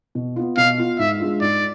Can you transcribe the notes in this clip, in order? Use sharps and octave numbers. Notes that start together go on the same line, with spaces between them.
B2
B3 F4
B2 F5
B3 F4
G#2 E5
G#3 D4 F4
G#2 D5